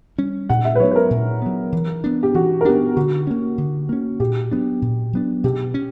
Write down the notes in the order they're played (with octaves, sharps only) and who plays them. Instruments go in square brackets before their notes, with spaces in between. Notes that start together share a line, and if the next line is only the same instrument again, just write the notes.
[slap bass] G3 C#4
[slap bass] A#2 [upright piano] F#5
[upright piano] E5
B4
[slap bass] F#3 B3 [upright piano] C#5
[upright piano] B4
A#4
[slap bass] A#2
F#3 B3
E3
B3 D4
[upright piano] G4
[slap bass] E3 [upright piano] F#4
[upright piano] A#4
[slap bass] B3 D4 [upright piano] G4
[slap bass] D3 [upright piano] F#4
[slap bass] A#3 C#4
D3
A#3 C#4
[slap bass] A#2 [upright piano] G4
[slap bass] F#3 B3 D4
A#2
F#3 B3 D4
[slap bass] B2 [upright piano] G4
[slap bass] C#4